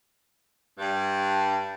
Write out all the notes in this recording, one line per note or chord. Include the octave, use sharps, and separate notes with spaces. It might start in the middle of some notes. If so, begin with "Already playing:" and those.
G2